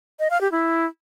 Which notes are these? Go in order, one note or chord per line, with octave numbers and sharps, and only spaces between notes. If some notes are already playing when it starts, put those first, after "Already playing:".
D#5
F5
G4
E4